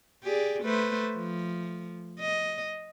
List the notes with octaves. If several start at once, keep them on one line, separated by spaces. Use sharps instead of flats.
G4 G#4 D5
A3 B4 C5
F3
D#5